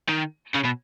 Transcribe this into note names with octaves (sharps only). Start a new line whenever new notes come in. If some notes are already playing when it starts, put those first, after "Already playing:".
D#3
C#3
B2